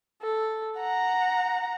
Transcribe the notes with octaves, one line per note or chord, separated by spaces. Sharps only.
A4
F#5 A#5